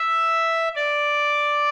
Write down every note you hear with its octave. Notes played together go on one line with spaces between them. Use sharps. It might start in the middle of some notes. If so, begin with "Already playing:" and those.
Already playing: E5
D5